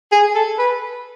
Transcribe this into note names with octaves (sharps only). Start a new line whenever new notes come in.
G#4
A4
B4